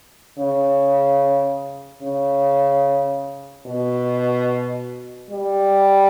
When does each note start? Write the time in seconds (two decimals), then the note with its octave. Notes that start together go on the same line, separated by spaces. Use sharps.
0.38 C#3
2.02 C#3
3.66 B2
5.30 G3